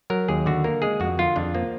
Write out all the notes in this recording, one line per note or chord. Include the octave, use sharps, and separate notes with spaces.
F#3 A#4
D#2 G#4
D3 F#4
A#3 A#4
G#3 G#4
F2 F#4
D3 F4
F2 D4
F3 A#3